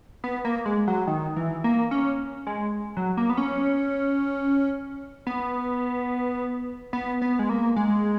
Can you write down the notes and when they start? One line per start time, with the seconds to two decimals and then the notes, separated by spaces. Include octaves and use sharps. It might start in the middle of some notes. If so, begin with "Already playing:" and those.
0.24 B3
0.45 A#3
0.65 G#3
0.88 F#3
1.07 D#3
1.36 E3
1.64 A#3
1.91 C#4
2.47 G#3
2.97 F#3
3.17 A#3
3.30 B3
3.37 C#4
5.27 B3
6.93 B3
7.22 B3
7.39 G#3
7.49 A#3
7.76 G#3